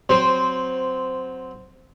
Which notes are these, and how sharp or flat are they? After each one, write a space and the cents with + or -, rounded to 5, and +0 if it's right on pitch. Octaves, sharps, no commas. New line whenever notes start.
F#3 +0 C4 -10 C5 +0